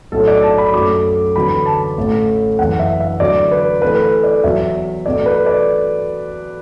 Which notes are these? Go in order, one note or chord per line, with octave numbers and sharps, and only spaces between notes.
B1 A2 A3 A4
D5
A5
B5
F#2 F#3 A3 D6
E2 D3 F#3 B3 B5
A5
A1 A2 A3
F#1 E2 E3 B3 F#5
E5
E5
E2 D3 F#3 A3 D5
B4
E2 E3 A3 B4
B4
D5
E2 B2 F#3 E5
E2 B2 A3 D5
B4
D5